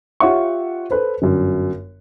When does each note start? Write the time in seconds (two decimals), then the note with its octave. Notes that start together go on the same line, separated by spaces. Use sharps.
0.20 F4 G4 C#5 E5 F#5 C#6
0.91 A4 B4 C5
1.22 G1 F#2